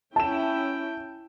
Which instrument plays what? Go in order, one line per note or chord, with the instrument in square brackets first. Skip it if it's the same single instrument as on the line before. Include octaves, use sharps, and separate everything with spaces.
[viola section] C#4 E4 G5 [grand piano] A5 E7